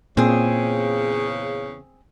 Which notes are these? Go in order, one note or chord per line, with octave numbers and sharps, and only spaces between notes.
E2 A#2 C#3 C4 G#4